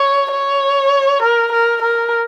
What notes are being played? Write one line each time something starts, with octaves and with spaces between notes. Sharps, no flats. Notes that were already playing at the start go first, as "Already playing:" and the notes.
Already playing: C#5
C#5
A#4
A#4
A#4